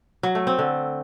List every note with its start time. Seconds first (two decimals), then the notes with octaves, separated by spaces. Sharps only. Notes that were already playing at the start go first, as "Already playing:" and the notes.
0.23 F#3
0.35 A3
0.47 C4
0.59 D3